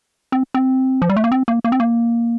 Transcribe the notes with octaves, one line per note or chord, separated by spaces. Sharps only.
C4
C4
F3
G3
A3
A#3
C4
A#3
A#3
C4
A#3